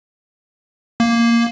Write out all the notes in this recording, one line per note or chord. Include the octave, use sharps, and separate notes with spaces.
A#3